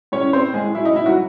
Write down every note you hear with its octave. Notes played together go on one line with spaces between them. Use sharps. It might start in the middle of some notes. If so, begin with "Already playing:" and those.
A2 C#4 C#5
C4 C5
A2 G#3 G#4
F#3 E4
D#4
A2 E4
F#3 F#4